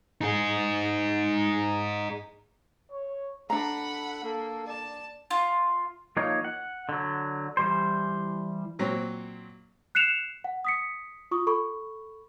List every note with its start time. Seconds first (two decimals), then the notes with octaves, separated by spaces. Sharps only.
0.21 D#4 G#4
2.91 C#5
3.50 D4 A4 F#5 A#5 B5
4.24 A#3 A4
4.68 D5 A5
5.31 F4
6.17 F3 A#3 D#4 C#5
6.44 F#5
6.89 D3 F#3
7.57 E3 G3 C5
8.79 A#2 F#3 C4
9.95 F#6 C7 C#7 E7 F7
10.44 F#5
10.65 D#6 B6 C#7
11.31 F4 C#6 D#6
11.47 A4 B5 C#6